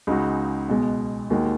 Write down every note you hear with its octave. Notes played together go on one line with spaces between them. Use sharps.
C#2 C#3 G#3 D#4 F#4
B1 B2 G#3
D#2 D#3 G#3 D#4 F#4